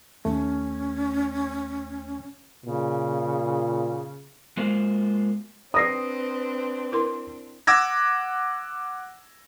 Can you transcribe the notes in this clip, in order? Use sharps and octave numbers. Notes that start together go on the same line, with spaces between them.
D#2 A3 C#4
A#2 C#3
G#3 A#3 F4 C5
C4 D4 B4 D#6 A#6 C7
E4 A#4 C6
F#5 D6 E6 G#6 A#6